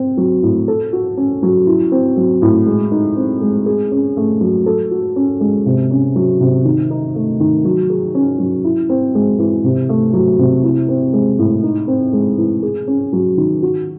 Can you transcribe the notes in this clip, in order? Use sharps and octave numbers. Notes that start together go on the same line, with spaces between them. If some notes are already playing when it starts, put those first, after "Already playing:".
Already playing: C4
F#3
A2
A4
F#4
C#4
F#3
E4
C4
F#3
A2
G#3
D#4
C4
G#3
G#4
C#4
A3
F#3
A4
F#4
C#4
G#3
C3
C#4
F#3
C3
D#3
D#4
A3
D#3
F#3
G#4
C#4
F#3
E4
C4
G#3
E3
C3
A3
F#3
C3
E4
C4
G#3
A2
D#4
C4
G#3
E3
G#4
C#4
F#3
D#3
F#4